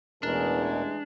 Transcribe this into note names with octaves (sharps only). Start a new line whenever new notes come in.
A1 E2 B2 E3 G#3 D4 A#4